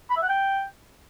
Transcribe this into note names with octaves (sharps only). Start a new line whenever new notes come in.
B5
E5
F#5
G5